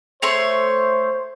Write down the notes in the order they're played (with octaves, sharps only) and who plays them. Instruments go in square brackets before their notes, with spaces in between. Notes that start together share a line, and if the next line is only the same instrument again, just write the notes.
[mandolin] A3 C#5 C6 [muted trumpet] C5